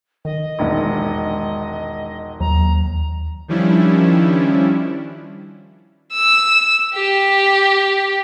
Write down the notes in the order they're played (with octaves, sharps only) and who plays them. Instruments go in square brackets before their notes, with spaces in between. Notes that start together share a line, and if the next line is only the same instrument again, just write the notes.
[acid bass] D#3 [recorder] D#5
[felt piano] E1 A#1 G#2
[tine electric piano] D#2 [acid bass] F#3 [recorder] A#5
[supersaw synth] D#3 F3 G3 C#4 D4 E4
[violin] E6
G4